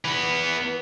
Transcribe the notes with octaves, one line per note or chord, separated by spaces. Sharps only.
E3 B3